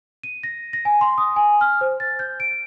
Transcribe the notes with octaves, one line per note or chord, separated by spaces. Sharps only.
D#7
A#6
A#6
G#5
C6
D#6
G#5
F6
C5
A6
G6
D7